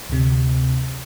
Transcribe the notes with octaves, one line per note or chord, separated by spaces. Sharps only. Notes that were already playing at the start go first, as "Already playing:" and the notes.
D2 C3